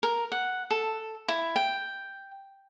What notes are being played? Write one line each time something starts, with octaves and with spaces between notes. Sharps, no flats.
A#4
F#5
A4
E4
G5